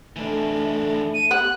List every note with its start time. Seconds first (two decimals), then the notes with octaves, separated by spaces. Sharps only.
0.16 E3 A3 D4
1.14 D#7
1.31 B3 G4 F#5 F#6